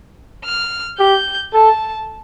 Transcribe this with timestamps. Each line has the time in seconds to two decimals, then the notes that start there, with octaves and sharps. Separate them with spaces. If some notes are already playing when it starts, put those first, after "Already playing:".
0.45 F6
0.99 G4 G6
1.54 A4 A5